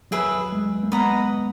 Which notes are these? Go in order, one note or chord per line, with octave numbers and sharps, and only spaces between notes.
F#3 G#4 B4 E5
G#3
A#3
G#3 B3 B4 D#5 F#5 A#5